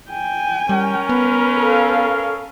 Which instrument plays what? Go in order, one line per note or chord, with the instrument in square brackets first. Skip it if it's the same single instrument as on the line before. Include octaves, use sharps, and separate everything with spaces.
[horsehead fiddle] G5 G#5
[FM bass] G3 [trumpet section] C#4 A#4
[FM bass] B3 [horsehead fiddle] B4
[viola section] A4 F5